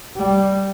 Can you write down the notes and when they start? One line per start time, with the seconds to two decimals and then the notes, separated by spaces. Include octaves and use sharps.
0.16 G3